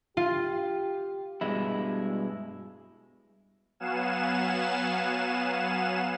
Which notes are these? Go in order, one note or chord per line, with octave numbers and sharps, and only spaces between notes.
F4 G4
G2 B2 G#3 E4
F#3 B3 F5 F#5 G#5 E7